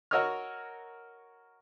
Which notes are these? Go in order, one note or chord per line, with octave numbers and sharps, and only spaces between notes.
F#4 A#4 C#5 D#5 E6 F6